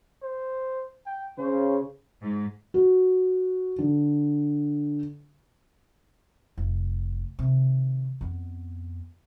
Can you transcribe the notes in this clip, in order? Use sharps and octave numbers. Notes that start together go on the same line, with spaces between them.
C5
G5
C#3 C5
G#2
F#4
D3
F1
C3 D#3
F2 B3